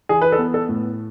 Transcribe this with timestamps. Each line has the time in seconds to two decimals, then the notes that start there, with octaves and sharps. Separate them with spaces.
0.09 E3 G#4
0.22 B4
0.32 A4
0.39 B3
0.54 A4
0.69 A2